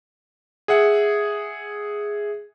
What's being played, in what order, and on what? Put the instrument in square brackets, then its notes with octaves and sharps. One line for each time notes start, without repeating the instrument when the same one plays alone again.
[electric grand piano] G#4 E5 F#5